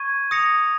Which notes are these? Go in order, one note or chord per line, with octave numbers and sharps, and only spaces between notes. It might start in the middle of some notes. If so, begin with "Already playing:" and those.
Already playing: C#6 G#6 D#7
D#6 A#6 C#7 F7